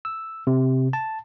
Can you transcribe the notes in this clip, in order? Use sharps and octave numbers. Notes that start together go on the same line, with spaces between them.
E6
C3
A5